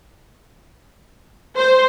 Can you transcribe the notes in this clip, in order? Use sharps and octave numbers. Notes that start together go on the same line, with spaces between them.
C5